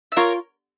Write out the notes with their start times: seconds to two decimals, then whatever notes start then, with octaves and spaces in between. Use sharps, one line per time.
0.12 E5
0.16 F4 A#4 C#5